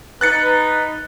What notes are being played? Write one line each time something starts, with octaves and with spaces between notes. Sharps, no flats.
D#4 B4 F#6 A6 C#7